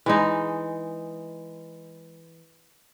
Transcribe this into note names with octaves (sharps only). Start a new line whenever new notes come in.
E3 G#3 D#4